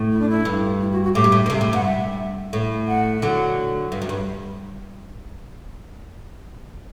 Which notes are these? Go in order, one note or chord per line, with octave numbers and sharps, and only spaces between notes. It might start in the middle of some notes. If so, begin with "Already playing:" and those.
Already playing: A2
E4
D4
E4
G2
E4
F#4
F#4
A2 G4
G2
A2
B2
C3
A2
G2 F#5
E5
A2
F#5
D3 F#3
G2
F#2
G2